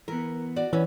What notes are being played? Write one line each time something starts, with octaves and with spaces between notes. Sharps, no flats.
E3 B3 A#4
F#4 D5
E3 B3 C#4